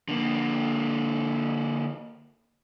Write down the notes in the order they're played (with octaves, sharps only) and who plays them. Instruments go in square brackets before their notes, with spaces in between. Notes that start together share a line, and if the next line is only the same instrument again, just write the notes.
[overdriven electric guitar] D3 A#3